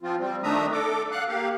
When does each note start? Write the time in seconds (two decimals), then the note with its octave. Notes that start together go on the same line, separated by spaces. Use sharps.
0.03 F3 C4 F4
0.20 G3 C4
0.43 D#3 A3 D4 E5 A#5 D#6
0.72 A4 D6
1.11 F5 F#5 F#6
1.28 A#3 G4 F5